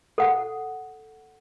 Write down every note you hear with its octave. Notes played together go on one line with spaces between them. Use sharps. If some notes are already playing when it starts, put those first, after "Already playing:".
A4 F#5